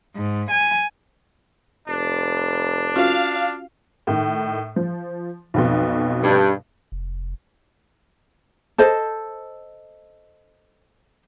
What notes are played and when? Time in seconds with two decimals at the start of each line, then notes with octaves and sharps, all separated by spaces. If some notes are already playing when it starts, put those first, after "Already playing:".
0.15 G#2
0.50 G#5
1.88 F1 D4
2.96 C#4 F4 F#4 F5
4.07 A2 D#3
4.76 F3
5.54 B1 F2 B2
6.24 G2
6.92 F1
8.78 A4 C5 D#5